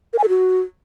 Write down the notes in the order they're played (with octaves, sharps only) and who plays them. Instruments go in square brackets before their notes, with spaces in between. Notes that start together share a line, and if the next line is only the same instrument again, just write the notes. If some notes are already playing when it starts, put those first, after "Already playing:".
[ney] A#4
G#5
A4
F#4